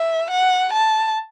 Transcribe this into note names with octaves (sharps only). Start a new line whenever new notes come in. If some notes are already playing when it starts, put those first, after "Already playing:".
Already playing: E5
F#5
A5